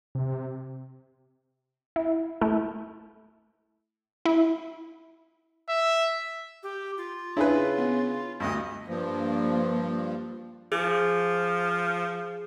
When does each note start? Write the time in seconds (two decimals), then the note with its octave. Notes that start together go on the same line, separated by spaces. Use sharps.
0.15 C3
1.96 E4
2.41 A3 E4
4.26 E4
5.69 E5
6.63 G4
6.97 F4
7.37 C#3 D4 E4 G#4 B4
7.78 B3
8.40 D2 G2 D#5
8.88 G2 F3 A#3
10.72 F3 G#4